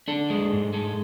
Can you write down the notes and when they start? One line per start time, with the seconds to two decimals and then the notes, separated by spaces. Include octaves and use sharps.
0.08 D4 A4
0.30 G#3
0.52 G#2
0.73 G#3 A4